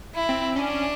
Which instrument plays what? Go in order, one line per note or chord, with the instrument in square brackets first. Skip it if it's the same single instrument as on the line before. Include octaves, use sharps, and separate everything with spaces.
[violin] E4
[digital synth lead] C4
[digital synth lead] C#4 [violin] D4